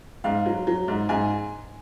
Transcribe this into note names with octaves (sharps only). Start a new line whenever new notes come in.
G#2 F5
F#3
F#3
G#2
G#2 G#5